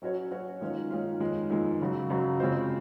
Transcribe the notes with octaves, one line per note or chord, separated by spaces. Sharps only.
F#3 C#4 F#4 C#5
F#3 C#4 F#4 C#5
D#3 G#3 C#4 F4
D#3 G#3 C#4 F4
F2 D#3 G#3
F2 D#3 G#3
F#2 C#3 F#3
F#2 C#3 F#3
C#3 G#3 C4 F4 C5